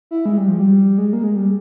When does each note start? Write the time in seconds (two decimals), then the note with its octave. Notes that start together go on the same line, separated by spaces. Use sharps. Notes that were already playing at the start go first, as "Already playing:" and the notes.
0.11 E4
0.26 G#3
0.37 G3
0.48 F3
0.60 G3
0.98 G#3
1.13 A#3
1.24 G#3
1.36 G3